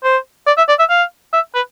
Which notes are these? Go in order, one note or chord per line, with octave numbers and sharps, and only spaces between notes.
C5
D5
E5
D5
E5
F5
E5
B4